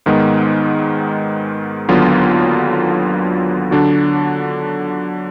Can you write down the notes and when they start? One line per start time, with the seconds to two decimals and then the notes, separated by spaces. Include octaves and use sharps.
0.06 G#2 D#3 G#3 B3
1.89 D#2 D3 F#3 B3 F4
3.71 D3 F#3 D4 F#4